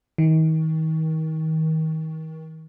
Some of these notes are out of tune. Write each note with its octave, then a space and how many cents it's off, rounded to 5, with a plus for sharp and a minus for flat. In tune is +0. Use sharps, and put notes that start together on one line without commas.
D#3 +35